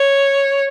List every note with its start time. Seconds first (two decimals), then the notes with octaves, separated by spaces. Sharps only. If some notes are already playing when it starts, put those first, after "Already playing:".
Already playing: C#5